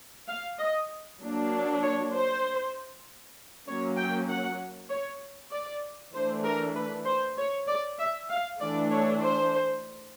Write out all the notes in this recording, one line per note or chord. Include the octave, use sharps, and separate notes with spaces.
F5
D#5
F#3 A#3 D4
C#5
C5
F#3 A#3 C#4 C#5
G5
F#5
C#5
D5
E3 A3 D4 C5
A#4
B4
C5
C#5
D5
E5
F5
E3 A3 D4 D5
C#5
C5